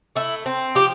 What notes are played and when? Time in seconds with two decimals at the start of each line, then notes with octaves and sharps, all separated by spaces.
0.16 A3 E4
0.46 C4
0.75 F3 G4